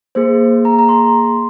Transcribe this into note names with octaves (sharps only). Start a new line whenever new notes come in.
A#3 G#4 C5
A#5
A#5
C6